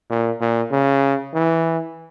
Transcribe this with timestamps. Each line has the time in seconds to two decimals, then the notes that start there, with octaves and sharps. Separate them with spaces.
0.09 A#2
0.40 A#2
0.71 C#3
1.34 E3